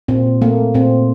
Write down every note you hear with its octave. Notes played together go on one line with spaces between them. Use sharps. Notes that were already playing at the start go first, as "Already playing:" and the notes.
A#2 C4
A3 A#3
A#2 C4